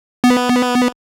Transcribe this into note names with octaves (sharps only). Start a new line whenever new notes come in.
B3